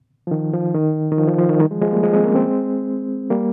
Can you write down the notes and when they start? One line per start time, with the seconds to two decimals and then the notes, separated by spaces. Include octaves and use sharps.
0.27 F3
0.31 D#3
0.53 F3
0.74 D#3
1.12 D#3
1.17 F3
1.27 F3
1.38 F3
1.49 D#3
1.60 D#3 G3
1.71 F3 G#3
1.82 F3 G#3
1.92 G3 A#3
2.03 F3 G#3
2.13 G#3 C4
2.24 A#3 C#4
2.35 G#3 C4
3.30 G3 A#3